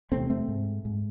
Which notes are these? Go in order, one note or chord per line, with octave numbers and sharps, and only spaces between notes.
E2 C3 A3 C4
A3 C4
G#2
G#2